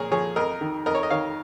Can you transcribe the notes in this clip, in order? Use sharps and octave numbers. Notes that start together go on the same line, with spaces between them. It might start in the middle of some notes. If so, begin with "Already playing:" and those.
Already playing: A#2 F3 G#4 A#4 C#5
F3 G#4 C#5
F2 A#4 D#5
D#3
F2 A#4 D#5
C#5
D#5
D#3 C#5 F5